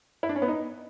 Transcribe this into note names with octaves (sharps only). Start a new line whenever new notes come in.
E4
D4
C#4
B3
D#4